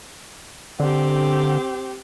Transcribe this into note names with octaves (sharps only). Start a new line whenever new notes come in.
D3 C4 G4